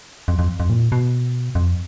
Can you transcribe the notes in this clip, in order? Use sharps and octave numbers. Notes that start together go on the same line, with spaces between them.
F2
F2
F2
A#2
B2
F2